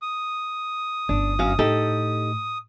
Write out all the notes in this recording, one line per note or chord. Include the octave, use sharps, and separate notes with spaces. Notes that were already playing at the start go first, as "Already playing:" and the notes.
D#6
G1 C#4 D4
F#2 F#4 F5
A2 D#4 G4 A4